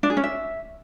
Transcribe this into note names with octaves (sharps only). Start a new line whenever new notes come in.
D4
G#4
C#4
E5